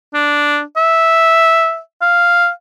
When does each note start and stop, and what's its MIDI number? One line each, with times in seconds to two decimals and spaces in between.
0.14 0.61 62
0.76 1.79 76
2.02 2.49 77